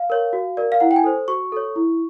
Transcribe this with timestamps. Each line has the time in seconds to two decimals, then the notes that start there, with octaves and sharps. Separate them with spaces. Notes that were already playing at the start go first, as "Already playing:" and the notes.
Already playing: F5
0.10 A#4 C#5
0.33 F#4
0.57 A#4 D5
0.72 F5
0.80 E4 F#5
0.91 G5
0.96 G#5
1.04 A4 C5
1.28 F#4 C#6
1.52 A4 C#5
1.76 E4